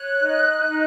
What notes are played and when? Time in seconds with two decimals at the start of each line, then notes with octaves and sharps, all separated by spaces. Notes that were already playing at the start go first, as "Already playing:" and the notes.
Already playing: C#5 F#6
0.21 D#4
0.67 D#4